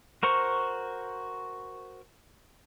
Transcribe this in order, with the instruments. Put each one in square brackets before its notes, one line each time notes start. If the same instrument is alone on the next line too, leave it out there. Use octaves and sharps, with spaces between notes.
[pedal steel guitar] F#4 A#4 C5 C#6